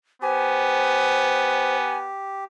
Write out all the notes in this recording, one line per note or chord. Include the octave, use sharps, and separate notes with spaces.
B3 G4 C5 G#5